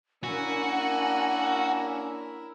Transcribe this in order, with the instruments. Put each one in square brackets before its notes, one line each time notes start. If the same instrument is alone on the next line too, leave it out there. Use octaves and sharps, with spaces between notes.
[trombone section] A#3 C#4 D4 [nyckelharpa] E4 A#4 [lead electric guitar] F#4 [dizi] G#5